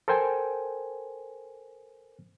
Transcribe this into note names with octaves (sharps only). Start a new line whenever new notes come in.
A4 A#4 C5 G5 G#5